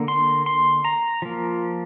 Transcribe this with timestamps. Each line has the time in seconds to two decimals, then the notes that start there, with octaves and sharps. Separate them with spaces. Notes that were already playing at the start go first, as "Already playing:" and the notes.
Already playing: D3 A#3
0.08 C6
0.46 C6
0.85 A#5
1.22 F3 A#3